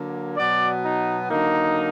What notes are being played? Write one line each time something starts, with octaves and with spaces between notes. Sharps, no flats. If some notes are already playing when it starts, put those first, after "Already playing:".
Already playing: D3 F#3 A#3
B2 F#3 B3 D5
D#4
D3 F#3 A#3 D#4